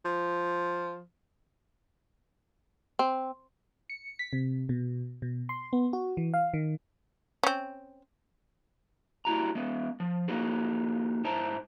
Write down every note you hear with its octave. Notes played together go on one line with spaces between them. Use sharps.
F3
C4
C#7
B6
C3
B2
B2
C6
B3
F#4
E3
F5
D#3
C4 C#4
G3 E4 F#4 A#5
G#3 B3
F3
A#3 D#4 F#4 G#4
G#2 E4 C5 A5 A#5